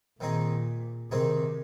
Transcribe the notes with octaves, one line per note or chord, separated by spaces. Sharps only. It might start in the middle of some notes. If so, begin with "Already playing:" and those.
A#2 D#3 C4 D#4 G#4
C3 D#3 C4 D#4 G#4